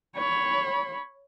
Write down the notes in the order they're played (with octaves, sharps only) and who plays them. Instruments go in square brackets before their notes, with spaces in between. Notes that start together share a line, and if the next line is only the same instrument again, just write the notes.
[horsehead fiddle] C#5 B5